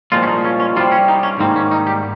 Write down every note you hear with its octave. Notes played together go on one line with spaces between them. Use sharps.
C2 A#2 F3 G#3 C4 F4
C#4
D#4
C#4
C#4
C2 C3 G3 C4 F4
C#4
D#4
C#4
G#2 D#3 G3 A#3 C4
C#4
D#4
G4